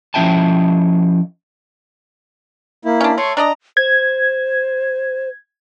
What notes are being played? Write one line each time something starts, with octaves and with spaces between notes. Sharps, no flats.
F3 C#4 E4 E5 G5 A5
A#3 E4
C#4 D4
A3 C#5 C6
D4 D5 D#5 A#5
C5 G#6